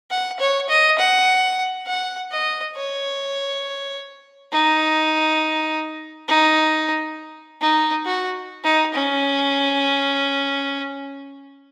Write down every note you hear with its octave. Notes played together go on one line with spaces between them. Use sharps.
F#5
C#5
D#5
F#5
F#5
D#5
C#5
D#4
D#4
D#4
F#4
D#4
C#4